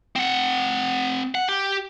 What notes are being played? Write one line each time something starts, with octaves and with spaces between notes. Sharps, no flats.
C4 F#5
F#5
G4